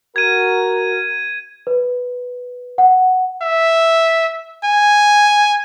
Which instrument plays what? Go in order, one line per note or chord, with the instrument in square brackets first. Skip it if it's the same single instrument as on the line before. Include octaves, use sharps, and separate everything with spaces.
[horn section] F#4 A#4 [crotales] G#6 D#7
[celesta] B4
F#5
[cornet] E5
G#5